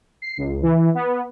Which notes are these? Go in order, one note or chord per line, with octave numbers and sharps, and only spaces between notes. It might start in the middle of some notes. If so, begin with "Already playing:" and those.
C7
C#2
E3
B3